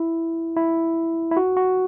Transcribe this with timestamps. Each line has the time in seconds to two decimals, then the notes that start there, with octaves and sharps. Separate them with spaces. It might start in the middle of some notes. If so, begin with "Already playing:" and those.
Already playing: E4
0.56 E4
1.31 E4
1.37 F#4
1.57 F#4